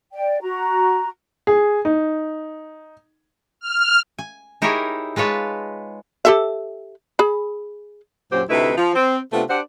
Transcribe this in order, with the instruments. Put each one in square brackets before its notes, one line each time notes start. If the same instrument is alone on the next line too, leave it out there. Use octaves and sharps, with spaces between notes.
[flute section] D5 G5
F#4 A#5
[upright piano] G#4
D#4
[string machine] F6
[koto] G#5
D#4 E4 G4 G#4 A#4 C#5
G#3 F4 B4 C#5 A5
[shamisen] G4 A4 E5
G#4 B5
[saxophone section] F#2 A#2 F#3 G4 C5
D2 C3 A3 D#4 E4 B4
F3
C4
C3 A3 B3 C4 D4 F4
D4 G4 C5 D5 F#5